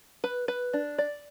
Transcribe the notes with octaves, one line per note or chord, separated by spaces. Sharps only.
B4
B4
D4
D5